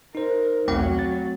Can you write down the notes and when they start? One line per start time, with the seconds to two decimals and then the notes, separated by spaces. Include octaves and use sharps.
0.15 D#4 A#4 C5
0.68 B1 E2 F#3 A3 C4 G5
0.99 A6